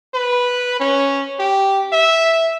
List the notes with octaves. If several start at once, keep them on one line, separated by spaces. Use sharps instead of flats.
B4
C#4
G4
E5